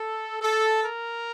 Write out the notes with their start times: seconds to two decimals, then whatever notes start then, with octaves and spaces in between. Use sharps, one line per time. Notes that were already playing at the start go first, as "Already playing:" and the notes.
Already playing: A4
0.41 A4
0.83 A#4